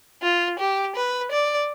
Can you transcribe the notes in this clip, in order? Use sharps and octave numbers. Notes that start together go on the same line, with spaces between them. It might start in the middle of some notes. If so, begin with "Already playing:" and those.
F4
G4
B4
D5